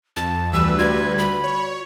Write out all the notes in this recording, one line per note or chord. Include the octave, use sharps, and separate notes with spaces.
F2 A5
D2 E3 G3 B4 E6
F4 F#4 D5 G#6
B5
C#5